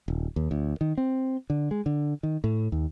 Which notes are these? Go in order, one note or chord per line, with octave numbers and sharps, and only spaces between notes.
D#1
D#2
D2
D#3
C4
D3
G#3
D3
D#3
A2
D#2